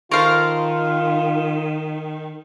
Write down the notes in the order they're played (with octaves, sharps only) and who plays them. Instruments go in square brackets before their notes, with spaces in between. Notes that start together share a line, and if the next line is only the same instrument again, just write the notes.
[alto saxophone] D#3 [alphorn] F4 [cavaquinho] A4 C5 C#6 [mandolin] A#4 F5